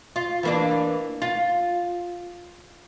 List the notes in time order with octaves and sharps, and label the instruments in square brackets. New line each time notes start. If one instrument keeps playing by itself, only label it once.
[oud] F4
E3 A#3 D4
F4